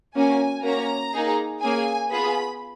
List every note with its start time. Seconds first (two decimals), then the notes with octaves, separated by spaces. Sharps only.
0.15 A#3 C#4 F#4 G#5
0.63 A#3 C#4 F#4 A#5
1.13 A#3 D#4 G#4
1.61 A#3 C#4 G#4 G#5
2.10 B3 F4 G#4 B5